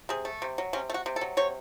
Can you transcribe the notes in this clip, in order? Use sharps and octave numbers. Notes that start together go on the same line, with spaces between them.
C3 G#4
A3
C3
F#3
C3 C#4
A3
F#4
C3
A4
F#3
C3 C#5